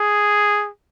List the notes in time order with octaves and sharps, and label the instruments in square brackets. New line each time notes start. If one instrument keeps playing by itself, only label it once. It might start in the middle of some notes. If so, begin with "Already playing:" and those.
Already playing: [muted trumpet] G#4